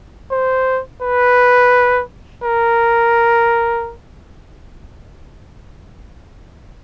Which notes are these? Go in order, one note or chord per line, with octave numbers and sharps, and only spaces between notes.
C5
B4
A#4